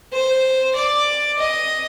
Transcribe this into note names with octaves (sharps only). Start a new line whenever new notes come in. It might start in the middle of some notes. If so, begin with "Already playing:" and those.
C5
D5
D#5